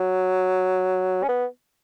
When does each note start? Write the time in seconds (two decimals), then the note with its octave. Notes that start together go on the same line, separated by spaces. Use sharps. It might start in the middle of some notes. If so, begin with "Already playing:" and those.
Already playing: F#3
1.23 C#4
1.28 B3